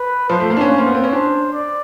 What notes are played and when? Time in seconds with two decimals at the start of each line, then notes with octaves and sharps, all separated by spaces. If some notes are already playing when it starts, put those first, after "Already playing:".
Already playing: B4
0.30 F3 C5
0.40 A3
0.50 A#3
0.57 D4
0.61 C#4
0.71 C5
0.78 A#3
0.86 B3
0.95 C4
1.04 C#4
1.12 D4 C5
1.53 D5